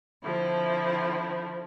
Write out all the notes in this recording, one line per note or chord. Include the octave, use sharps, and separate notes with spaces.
D3 F3 C4 E4